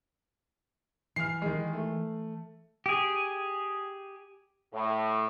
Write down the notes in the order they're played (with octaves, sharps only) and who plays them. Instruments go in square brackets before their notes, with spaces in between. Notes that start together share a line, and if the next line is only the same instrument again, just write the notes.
[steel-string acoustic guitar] E3 [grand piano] F6 C7
[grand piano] D#3 G#3
A3
[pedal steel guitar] G4 G#4
[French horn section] A2